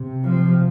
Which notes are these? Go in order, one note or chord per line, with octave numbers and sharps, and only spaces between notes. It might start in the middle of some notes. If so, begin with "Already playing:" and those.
Already playing: C3
F3